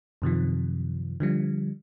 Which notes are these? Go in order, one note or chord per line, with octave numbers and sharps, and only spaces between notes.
F#2 C3 D#3 F3
D3 F3 G3